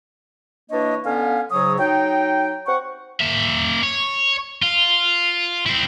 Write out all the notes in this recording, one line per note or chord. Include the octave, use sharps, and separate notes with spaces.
E3 A#3 D4 C#5 D#5
D3 B3 C#4 F5
G#2 C#3 F#3 C#5 D#6
F#3 D#4 G5
C4 F#5 C#6
A#3 E5
C#5
F4
C4 E4